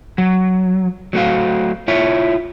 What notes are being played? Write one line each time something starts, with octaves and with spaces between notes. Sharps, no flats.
F#3
F#3 A3 F#4 F5
E4 F4 C#5 E5